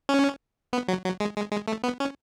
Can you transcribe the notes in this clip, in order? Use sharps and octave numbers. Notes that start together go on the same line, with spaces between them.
C#4
B3
F#3
F#3
G#3
G#3
G#3
A3
B3
C#4